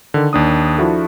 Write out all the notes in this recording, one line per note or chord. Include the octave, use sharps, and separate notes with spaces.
D3 D#3
D#2 D4 D#6
F3 D4 E4 F#4 A4